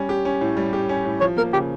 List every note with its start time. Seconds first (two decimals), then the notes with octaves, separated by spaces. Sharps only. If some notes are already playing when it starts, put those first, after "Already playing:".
Already playing: G3 C#4
0.09 G4
0.25 C#4
0.41 A2
0.57 G3
0.73 G4
0.89 C#4
1.05 A2
1.21 F3 C#5
1.37 A#3 A#4
1.53 C#3 G4